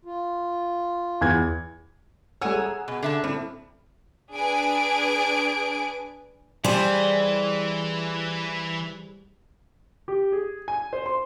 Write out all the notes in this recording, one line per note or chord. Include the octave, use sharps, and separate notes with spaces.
F4
E2 G#6
G3 A3 C#5 F#5 G#5 E6
G#4 A#5
B2
D3 E5 A5
A2 G3 C4
D4 G#4 B4 G#5 D7
E3 G3 G#4 C5
G4
G#4
G#5
C5
C6